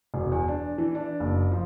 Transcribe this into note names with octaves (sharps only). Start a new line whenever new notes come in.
E1
E2
D4
E3
D4
F#1
F3